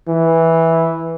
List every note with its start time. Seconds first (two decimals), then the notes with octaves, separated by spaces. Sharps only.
0.08 E3